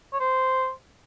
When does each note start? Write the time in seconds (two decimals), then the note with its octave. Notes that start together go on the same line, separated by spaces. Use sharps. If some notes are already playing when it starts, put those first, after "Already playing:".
0.13 C#5
0.20 C5